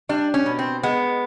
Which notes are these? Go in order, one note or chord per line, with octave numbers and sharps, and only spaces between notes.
G3 D4
C#4
B2
C4
G#3 B3